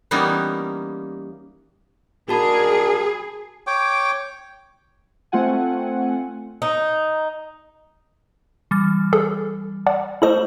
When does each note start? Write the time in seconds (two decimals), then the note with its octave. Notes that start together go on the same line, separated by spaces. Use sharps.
0.11 E3 G3 A#3 B3 C#4 D#4
2.29 D4 D#4 F#4 G#4 A#4 A5 B5
3.67 C#5 G5 D6
5.32 A3 C4 F4 F#5 G#5
6.62 D#4
8.71 E3 G3 A6
9.13 G#4 A4
9.86 D5 F#5 A5
10.22 A3 E4 A4 C5 D#5 F#7